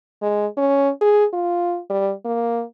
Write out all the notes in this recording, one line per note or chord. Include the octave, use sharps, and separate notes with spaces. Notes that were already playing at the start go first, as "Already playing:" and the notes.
G#3
C#4
G#4
F4
G3
A#3